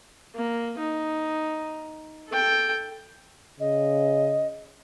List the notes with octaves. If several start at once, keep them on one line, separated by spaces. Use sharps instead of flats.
A#3
D#4
A4 G5
C#3 D#5